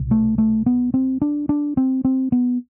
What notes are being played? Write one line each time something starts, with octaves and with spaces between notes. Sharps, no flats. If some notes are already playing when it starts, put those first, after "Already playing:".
Already playing: C2 B2
A3
A3
B3
C4
D4
D4
C4
C4
B3